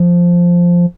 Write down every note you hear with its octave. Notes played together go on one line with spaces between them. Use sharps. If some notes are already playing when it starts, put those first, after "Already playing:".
Already playing: F3